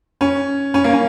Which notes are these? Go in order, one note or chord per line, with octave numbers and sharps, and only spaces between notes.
C#4
C#4
A#3
C#4